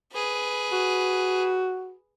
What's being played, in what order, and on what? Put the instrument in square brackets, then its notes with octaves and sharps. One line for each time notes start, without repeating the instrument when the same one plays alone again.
[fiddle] G#4 B4
[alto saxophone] F#4